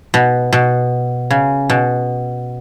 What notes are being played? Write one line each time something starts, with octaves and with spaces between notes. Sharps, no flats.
B2
B2
C#3
B2